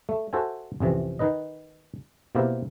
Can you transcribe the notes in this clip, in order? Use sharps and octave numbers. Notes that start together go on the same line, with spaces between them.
A3
F#4 A4 C5 E5 G#5
A1 F2 C3 E3
D#3 D#4 B4 D#5
B2 A#3 C4 E4 G4 A#4